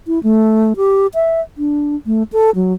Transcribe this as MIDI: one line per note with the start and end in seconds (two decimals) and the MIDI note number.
0.07 0.22 64
0.23 0.73 57
0.77 1.07 67
1.14 1.41 76
1.58 1.96 62
2.06 2.23 57
2.33 2.50 69
2.55 2.73 54